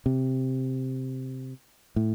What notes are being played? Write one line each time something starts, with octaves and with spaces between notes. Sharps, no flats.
C3
A2